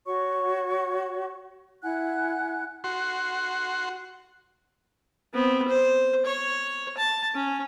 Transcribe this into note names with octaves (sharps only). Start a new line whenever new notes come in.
F#4 C#5 C#6
E4 F#5 G#5 F#6
F#4 C6
B3 C4
C5
C#5
A5
C#4